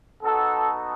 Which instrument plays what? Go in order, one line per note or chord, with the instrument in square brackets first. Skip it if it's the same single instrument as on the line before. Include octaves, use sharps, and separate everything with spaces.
[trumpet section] B3 D#4 F#4 A4